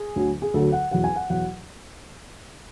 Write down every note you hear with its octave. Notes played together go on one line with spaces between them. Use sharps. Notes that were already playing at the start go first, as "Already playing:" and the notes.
Already playing: G#4
D2 D3 F#3
G#4
D2 D3 F#3 A4
F#5
E2 B2 F#3 F#5
G#5
F#5
E2 B2 F#3 F#5